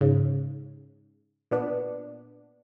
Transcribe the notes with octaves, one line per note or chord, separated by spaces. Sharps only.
G#2 C#3
A#2 B3 D4